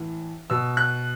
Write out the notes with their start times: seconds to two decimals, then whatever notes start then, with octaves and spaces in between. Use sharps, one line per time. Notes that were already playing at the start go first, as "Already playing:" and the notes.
Already playing: A2 E3
0.50 B2 E6
0.77 F#6